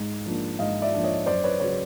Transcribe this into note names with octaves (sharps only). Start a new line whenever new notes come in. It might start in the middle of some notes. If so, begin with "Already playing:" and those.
Already playing: G#2
F3 A#3 D4
G#2 D#5 F5
D5 E5
F3 A#3 D4
C#5 D#5
F#2 C5 D5
B4 C#5
C#3 F#3 B4 C#5